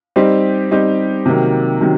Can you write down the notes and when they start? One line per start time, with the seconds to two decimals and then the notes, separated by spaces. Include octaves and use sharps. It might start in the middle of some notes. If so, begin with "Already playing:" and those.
0.16 G3 C4 D#4 G4
0.71 G3 C4 D#4 G4
1.26 C3 D#3 F#3 A#3
1.81 C3 D#3 F#3